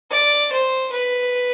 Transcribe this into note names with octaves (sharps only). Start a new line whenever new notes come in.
D5
C5
B4